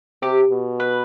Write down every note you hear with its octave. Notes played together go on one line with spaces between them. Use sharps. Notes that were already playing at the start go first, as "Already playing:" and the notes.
C3 G4
B2
B4